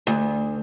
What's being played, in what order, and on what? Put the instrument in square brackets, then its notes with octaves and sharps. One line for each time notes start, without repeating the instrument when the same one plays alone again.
[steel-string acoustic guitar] D2